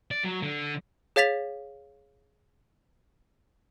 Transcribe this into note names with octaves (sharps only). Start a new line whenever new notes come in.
D5
F#3
D3
G#4 C#5 F5 A6 B6 F7